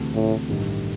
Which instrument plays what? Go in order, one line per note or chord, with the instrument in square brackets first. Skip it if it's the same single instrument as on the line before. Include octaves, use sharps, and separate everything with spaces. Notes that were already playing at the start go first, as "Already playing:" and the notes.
Already playing: [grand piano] D2 C3 E3 A3 C4
[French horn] A2
[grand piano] A1 G2 D#3 G3